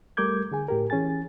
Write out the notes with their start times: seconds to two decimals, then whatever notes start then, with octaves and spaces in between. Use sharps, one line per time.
0.17 G3 A3 A#4 D6 G6 G#6
0.51 D3 G#4 G#5
0.68 A2 G4 A#4
0.90 E3 C#4 G#4 G#5 A6